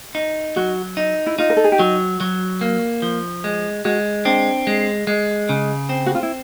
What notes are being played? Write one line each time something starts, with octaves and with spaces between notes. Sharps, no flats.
D#4
F#3 F#4
D#4
E4
D#4 F4
A#4
A4
G#4
G4
F#3 F#4
F#3
A#3
F3
G#3
G#3 F#4
C4 D4
G#3
G#3
C#3
C4
F#4
F4
E4